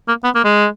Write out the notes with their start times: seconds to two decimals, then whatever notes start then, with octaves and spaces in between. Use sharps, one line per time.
0.08 A#3
0.24 B3
0.35 A#3
0.45 G#3